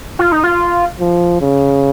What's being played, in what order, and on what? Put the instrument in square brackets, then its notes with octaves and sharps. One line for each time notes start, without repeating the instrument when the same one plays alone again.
[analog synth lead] F4
D#4
F4
[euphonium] F3
C#3